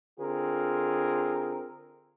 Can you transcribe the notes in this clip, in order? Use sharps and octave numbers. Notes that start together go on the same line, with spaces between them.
D3 C4 F4 G#4 A#4